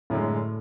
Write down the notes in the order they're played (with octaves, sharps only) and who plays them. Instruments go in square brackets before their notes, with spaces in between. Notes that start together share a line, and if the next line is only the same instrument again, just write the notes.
[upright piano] F#2 D3 G#3 [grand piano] A2